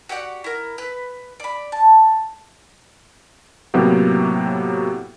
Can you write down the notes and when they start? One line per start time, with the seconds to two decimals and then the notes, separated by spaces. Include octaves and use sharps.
0.09 F#4 G4 D5 F#5
0.44 E4 A#4
0.78 B4
1.40 D5 B5
1.72 A5
3.74 A2 C3 F#3 A#3 B3 G4